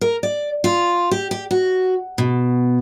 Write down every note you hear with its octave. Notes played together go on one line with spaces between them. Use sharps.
A#4
D5
F4
G4
G4
F#4
B2